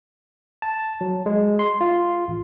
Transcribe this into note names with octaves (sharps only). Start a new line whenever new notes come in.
A5
F#3
G#3
C6
F4
A1